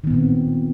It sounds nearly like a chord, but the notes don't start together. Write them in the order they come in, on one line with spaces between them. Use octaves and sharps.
D#3 B3 A#2 C4